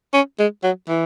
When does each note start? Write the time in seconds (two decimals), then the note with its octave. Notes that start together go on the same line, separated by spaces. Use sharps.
0.13 C#4
0.39 G#3
0.63 F#3
0.89 E3